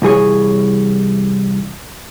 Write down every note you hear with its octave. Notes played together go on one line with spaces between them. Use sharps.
C2 E3 G#4 C#5